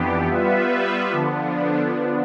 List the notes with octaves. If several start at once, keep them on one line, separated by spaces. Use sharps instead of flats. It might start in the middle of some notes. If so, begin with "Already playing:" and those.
Already playing: F2 E3 B3 D4 G4
G3 B3 F4 B4 E5
D3 F3 B3 D4